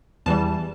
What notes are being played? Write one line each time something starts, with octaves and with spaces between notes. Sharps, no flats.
E2 E3 G3 A5